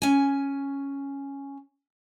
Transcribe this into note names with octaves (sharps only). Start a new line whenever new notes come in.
C#4 G#5